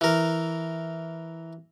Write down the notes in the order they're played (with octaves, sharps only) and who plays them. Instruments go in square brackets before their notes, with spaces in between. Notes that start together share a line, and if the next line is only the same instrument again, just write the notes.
[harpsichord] E3 A#4